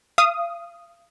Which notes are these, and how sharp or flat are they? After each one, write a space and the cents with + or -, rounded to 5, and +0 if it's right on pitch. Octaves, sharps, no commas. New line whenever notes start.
F5 -30 D#6 +0